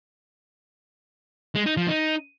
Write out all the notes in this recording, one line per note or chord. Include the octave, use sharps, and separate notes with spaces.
G#3
D#4
F3
D#4